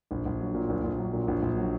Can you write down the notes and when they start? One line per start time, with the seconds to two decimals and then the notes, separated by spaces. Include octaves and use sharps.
0.11 A#1
0.25 A#1
0.40 F#3
0.55 A#2
0.69 A#1
0.84 A#1
0.99 F#3
1.13 A#2
1.28 A#1
1.42 A#1
1.57 F#3